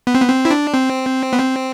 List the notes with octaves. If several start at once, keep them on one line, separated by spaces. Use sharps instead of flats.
B3
C4
B3
C4
E4
D4
C4
B3
C4